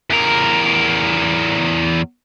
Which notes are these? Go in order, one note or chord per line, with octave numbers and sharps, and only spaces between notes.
E2 A#4